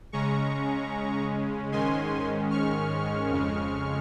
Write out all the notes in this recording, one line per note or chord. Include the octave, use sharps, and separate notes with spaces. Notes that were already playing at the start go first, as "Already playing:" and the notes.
C#3 G#3 C#4 A#5 C#6
G#2 D#3 G#3 C#4 G#5 C6
C#6 F6
F2 C#3 G#3